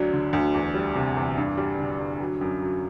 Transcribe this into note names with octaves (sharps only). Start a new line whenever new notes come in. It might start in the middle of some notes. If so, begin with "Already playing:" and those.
Already playing: D2 F#3 D4
D3
D2
E2
G3
C3
E2
G2
G3
D3
G2
F#3
F#2
F#3